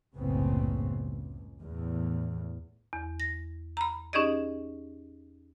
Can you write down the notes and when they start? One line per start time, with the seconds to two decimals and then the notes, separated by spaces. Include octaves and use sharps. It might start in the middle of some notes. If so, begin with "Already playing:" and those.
0.16 F#1 C2 A2 C#3 B3 C4
0.84 C#2
1.60 E2 A2
2.93 E2
3.20 A#6
3.77 A#5 B5
4.13 C#4 D#4 G4 G#4 D5 D#5